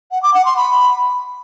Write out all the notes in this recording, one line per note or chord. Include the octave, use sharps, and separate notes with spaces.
F#5
D6
F#5
C6
B5